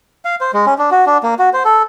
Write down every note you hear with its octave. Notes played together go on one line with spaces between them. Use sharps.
F5
C5
G#3
C#4
D4
F#4
D4
A#3
F#4
C5
A4